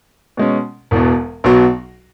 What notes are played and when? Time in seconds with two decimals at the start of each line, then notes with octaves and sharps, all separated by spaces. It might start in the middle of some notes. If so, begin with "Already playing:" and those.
0.37 B2 G#3 C#4
0.91 E1 E2 B2
1.44 B1 B2 F#3